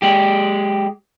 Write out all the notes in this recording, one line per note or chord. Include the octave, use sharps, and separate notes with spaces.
G#3 G4